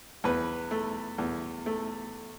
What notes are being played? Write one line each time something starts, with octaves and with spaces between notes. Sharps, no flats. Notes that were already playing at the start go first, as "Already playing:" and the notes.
E2 B4
A3
E2
A3